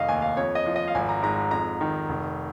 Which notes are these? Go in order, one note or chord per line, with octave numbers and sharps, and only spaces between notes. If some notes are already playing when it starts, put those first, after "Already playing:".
Already playing: F1 D#3 D#5 F5
D#2 G#5
F5
F2 C#5
D#5
F3
D#5
F5
G#1 G#5
A#5
G#2 A#5
F2 A#5
D#3
F1